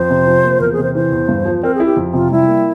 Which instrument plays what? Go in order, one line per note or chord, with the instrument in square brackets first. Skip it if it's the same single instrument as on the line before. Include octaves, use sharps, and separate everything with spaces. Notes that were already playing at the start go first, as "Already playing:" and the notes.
Already playing: [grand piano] F2 [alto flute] C5
[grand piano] C3
F3
A#3
[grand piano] E2 [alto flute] A#4
[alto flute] G#4
[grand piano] C3
[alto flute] C5
[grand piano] E3 [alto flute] C5
[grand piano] E2
G2
F3
[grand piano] C4 [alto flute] A#4
[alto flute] G#4
[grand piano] E4
[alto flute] G4
[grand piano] F2
[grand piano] C3 [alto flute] F4
[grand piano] G3 [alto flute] E4
[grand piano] A#3